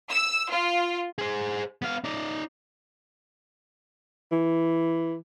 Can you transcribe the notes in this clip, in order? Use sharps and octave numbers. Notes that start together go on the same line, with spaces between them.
E6
F4
G#4 C5
B3 F5
D#4 D5
E3